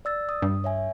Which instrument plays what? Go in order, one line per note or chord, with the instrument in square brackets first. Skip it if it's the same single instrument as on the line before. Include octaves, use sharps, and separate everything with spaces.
[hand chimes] D5 E6 A6
D#6
[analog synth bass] G2
[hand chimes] C#5 E5 G#5